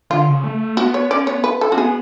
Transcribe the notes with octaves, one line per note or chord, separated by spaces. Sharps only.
D3 F4
C#3
A3
B3 F#4
C#5
C#4 D5
B3 C#5
B4
A4
C#4 F#4
B3 G#4